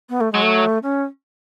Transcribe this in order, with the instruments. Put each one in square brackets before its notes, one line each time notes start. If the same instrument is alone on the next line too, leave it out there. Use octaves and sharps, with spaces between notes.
[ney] B3
A3
[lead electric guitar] F#3 [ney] G#3
[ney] A3
C#4